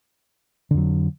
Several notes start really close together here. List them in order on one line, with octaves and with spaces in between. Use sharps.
D3 F2 F#3